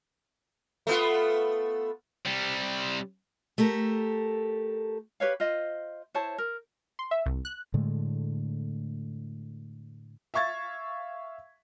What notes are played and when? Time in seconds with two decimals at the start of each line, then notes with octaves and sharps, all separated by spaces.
0.87 A3 B3 F4
2.25 C3 G3
3.58 A3 G4 A4 A#4
5.20 G4 B4 C#5 F5
5.40 F4 C5 D#5
6.14 E4 C5 C#5 A5
6.38 A#4
6.99 C6
7.11 E5
7.26 C2
7.45 F#6
7.74 A2 D3 G#3 A3
10.34 E5 F5 C#6 G#6 A6